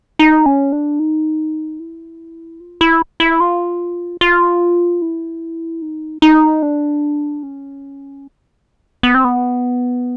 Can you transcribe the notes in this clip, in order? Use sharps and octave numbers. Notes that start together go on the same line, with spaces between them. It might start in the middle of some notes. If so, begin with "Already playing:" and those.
D#4
C#4
D4
D#4
E4
F4
E4
E4
F4
F4
E4
D#4
D#4
D4
C#4
B3
C4
B3